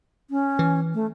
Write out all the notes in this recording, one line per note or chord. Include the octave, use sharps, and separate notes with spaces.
C#4
E3
A3